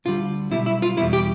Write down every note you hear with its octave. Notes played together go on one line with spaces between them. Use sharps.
D2 D3 G3 F4
B1 B2 G3 E4
E4
F4
E2 B2 G3 E4
G4